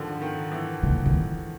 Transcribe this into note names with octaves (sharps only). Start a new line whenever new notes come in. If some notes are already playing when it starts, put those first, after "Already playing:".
Already playing: D3 D#3 F3
D#3
E3
C#3
D#3